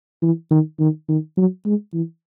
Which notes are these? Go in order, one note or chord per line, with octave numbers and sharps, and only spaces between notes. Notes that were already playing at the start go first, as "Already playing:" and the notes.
E3
D#3
D#3
D#3
F#3
G#3
E3